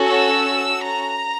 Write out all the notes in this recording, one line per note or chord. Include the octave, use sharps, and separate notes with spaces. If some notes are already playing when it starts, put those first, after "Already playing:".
Already playing: C#4 F#4 A4
E6
A#5